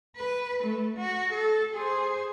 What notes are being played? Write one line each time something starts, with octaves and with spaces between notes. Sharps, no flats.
B4
A3
F#4
A4
G#4 C5